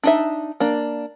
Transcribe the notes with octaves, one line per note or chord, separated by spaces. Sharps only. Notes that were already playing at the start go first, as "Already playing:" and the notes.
D4 D#4 E5
A#3 D4